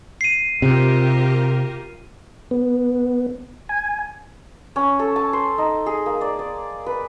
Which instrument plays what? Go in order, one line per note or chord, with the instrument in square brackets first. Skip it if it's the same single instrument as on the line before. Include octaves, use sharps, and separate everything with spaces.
[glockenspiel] C7 D#7
[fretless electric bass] C3 [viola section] F4 G4 A#4
[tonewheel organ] B3
G#5
[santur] C#4
A4
A5
C5
D#4
G#4
A#3
D5
D5
B4